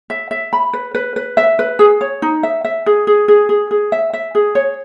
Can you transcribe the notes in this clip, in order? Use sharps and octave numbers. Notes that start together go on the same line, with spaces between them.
E5
E5
B5
B4
B4
B4
E5
B4
G#4
C#5
D#4
E5
E5
G#4
G#4
G#4
G#4
G#4
E5
E5
G#4
C#5